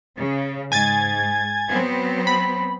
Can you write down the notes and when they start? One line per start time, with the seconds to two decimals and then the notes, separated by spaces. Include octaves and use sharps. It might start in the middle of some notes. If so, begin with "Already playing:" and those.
0.17 C#3
0.72 G#2 G#5 G#6 A6
1.69 F#3 B3 C4
2.27 B5